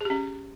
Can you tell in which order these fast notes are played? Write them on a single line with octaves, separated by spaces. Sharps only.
G#4 G4 C#4